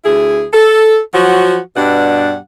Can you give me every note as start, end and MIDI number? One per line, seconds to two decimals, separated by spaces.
0.05 0.45 38
0.05 0.45 64
0.05 0.45 68
0.53 0.98 69
1.14 1.59 53
1.14 1.59 54
1.14 1.59 66
1.76 2.35 43
1.76 2.35 47
1.76 2.35 55
1.76 2.35 62
1.76 2.35 78